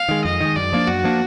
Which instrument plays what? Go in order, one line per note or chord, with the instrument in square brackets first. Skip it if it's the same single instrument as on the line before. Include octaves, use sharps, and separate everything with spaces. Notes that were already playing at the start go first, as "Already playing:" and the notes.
Already playing: [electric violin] F5
[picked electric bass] D#3 G#3
[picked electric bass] F2 [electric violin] D#5
[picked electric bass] D#3 G#3
[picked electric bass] F#2 [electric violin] D5
[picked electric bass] F3 A#3 D4
[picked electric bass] F#2 [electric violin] F#4
[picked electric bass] F3 A#3 D4